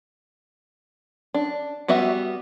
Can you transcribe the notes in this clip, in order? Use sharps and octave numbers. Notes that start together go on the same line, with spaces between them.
D4
G3 B3 F#4 E5